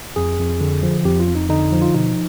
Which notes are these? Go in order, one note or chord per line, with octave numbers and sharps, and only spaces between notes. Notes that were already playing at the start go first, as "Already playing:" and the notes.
F2 G#4
F2
D3
F3
F2 G4
F4
F2
D#4
D3 D#4
F3
F4
B2 D#4